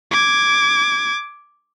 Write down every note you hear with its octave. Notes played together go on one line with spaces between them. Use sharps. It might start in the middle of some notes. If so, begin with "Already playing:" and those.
D6 G#6